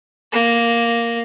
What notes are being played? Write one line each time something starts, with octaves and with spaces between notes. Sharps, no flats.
A#3